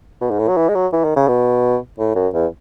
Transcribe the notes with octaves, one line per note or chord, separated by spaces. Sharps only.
B2
G#2
A2
F#3
E3
G#3
F#3
E3
D#3
C#3
B2
A2
F#2
E2